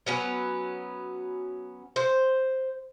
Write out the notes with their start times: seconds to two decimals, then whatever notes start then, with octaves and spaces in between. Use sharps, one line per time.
0.06 F#3 B3 C#4
1.96 C5